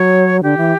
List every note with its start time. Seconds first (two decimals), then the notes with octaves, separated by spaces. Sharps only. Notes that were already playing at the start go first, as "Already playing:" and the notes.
Already playing: F#3 C#5
0.43 D3 G4
0.57 E3